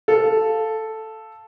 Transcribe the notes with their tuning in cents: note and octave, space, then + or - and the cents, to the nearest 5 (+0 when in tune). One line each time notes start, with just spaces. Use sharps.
A4 +0 F5 +0